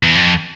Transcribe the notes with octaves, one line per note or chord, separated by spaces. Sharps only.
E2
F2